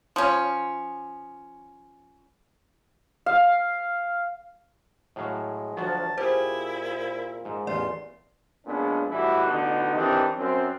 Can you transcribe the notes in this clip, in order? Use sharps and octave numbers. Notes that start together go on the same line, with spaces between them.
F3 C#4
F5
A2 F#3 G#3 F5
D2 F3 F#3 A5
A#2 E4 G4 G#4 C5
G#2
A1 E2 F4 D5 C6
A#2 G#3 B3 C#4 D4
B1 A2 E3 G3 E4 F#4
A1 B2 D3 D#4
D#3 E3 C4 D4 D#4 G4
F#2 C4